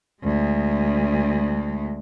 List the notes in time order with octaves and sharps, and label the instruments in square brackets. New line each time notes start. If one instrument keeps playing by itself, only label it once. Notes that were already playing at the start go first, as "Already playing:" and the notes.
[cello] D2 G#3